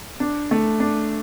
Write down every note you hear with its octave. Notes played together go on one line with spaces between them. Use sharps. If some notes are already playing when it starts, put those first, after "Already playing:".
D4
A3
D4